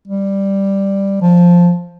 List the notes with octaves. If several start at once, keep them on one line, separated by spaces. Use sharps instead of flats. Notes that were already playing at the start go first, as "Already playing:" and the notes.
G3
F3